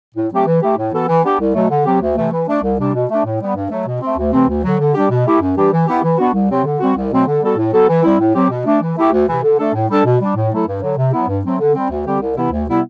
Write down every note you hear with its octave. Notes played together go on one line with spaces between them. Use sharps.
A2
F#3 A3 C4 G4
E3
A3 E4 G4
A2
E3 B3 F#4 A4
E3
B3 D4 G4
C2
B2 F#3 A3
D3
F#3 C4 G4
D2
C3 E3 A3
E3
A3 D4
C2
C3 G3 D4
B2
A3 D4
A2
G3 B3
G2
F#3 A3
B2
A3 C4
D2
C3 E3 A3 C4
D2
D3 F#3
D3
G3 D4 G4
B2
A3 E4 G4
F#2
E3 G3 D4 G4
E3
B3 E4 G4
E3
B3 D4 F#4
C2
C3 F#3 C4
D3
G3 C4 F#4
C2
B2 F#3 A3 C4
D3
G3 B3 F#4 A4
A2
F#3 B3 F#4 A4
E3
G3 C4 E4
A2
F#3 C4 G4
B2
A3 D4
E3
A3 E4 G4
D2
C3 E3
D3
A3 D4 A4
A2
G3 D4 A4
B2
G3 D4
A2
F#3 A3 E4 A4
G2
D3 F#3
C3
F#3 B3 E4
G2
F#3 A3 C4
D3
G3 C4
D2
D3 G3 C4 G4
C2
C3 E3 B3 E4
D2
C3 G3 B3 E4